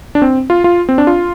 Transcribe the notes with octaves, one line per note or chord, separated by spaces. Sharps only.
D4
C4
F4
F4
C4
D4
F4